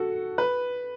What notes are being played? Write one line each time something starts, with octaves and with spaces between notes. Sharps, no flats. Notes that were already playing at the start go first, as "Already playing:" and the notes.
Already playing: F#4 A4
B4